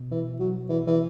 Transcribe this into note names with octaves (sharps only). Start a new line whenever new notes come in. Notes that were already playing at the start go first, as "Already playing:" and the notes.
Already playing: B2
E3
F#3
E3
E3